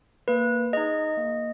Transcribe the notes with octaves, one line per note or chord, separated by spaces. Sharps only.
A#3 B4
D#4 G#4 D#5
A#3